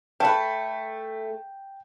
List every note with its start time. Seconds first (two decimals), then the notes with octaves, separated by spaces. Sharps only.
0.20 A3 B4 G5 A5